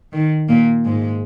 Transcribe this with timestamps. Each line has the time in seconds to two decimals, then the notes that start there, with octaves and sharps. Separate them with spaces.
0.13 D#3
0.48 A#2 A#3
0.85 G#2 G#3